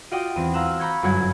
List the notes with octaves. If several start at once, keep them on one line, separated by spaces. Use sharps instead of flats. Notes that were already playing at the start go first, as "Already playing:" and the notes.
F4 F#4 D5 D#5 F#5 G5
E2 C4 D#7
F5 A#5 C6 E6 F#6
A#5 B5 C#6 G6 G#6
G1 F#2 F#4 C#5 F#5 G#6